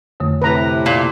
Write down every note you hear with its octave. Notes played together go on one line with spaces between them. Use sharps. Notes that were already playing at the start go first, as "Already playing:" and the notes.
F2 D3 A3
A2 C3 B4 A#5
A#2